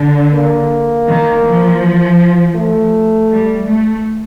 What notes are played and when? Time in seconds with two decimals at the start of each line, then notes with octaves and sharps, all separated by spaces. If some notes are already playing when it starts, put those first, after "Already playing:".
Already playing: D3
0.34 A#3
1.07 D#3
1.45 F3
2.56 A3
3.30 G3
3.68 A3